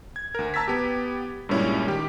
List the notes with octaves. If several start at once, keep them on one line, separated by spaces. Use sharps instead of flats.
G#6
D2 A#4
A5 A#5 E6 G#6 A6 B6
B3 G4
G2 A#2 G3 G#3 C#4 E4
D#3 G4